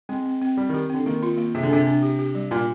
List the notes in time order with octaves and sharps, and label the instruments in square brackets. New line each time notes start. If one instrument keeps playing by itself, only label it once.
[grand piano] G#3 [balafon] C4
[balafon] C4
C4
[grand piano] G3 [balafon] C4
[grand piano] D#3 [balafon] G4
[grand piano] D3 [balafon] C4
[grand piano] D#3 [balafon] A#3
[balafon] F4
A#3
[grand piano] C3 [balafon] G#4
[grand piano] D3
[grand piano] C3 [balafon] D4
[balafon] D4
G4
G4
G3
[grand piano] A#2 [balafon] F4